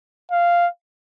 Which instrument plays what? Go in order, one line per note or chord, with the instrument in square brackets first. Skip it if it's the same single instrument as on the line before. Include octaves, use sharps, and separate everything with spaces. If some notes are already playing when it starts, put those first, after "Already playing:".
[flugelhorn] F5